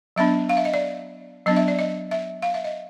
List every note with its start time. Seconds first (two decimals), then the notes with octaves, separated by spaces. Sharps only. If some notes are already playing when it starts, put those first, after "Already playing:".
0.16 F#3 B3 D4 E5
0.49 F5
0.57 E5
0.65 D#5
0.74 D5
1.46 F#3 B3 D4 D#5
1.56 E5
1.68 D5
1.79 D#5
2.11 E5
2.42 F5
2.54 E5
2.64 D#5